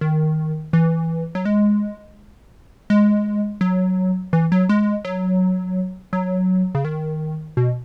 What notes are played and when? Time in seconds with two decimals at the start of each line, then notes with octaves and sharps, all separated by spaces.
0.01 D#3
0.73 E3
1.35 F#3
1.45 G#3
2.90 G#3
3.61 F#3
4.33 E3
4.52 F#3
4.69 G#3
5.05 F#3
6.13 F#3
6.75 C#3
6.85 D#3
7.57 B2